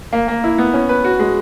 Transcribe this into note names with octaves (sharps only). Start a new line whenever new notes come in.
A#3
A#3
E4
B3
C#4
B4
F#4
G#3